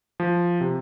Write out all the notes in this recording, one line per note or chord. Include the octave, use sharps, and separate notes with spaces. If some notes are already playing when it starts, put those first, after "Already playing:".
F3
C3